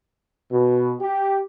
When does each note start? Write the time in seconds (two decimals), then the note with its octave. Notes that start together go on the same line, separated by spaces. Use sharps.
0.51 B2
1.00 G4